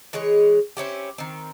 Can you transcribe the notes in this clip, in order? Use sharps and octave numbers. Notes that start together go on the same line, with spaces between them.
E3 G#3 G#4 C#5
C4 C#4 E4 G4
D#3 C4